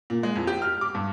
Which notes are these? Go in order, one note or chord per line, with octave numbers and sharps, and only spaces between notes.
A#2
G#3
F2
G4
F6
D6
G2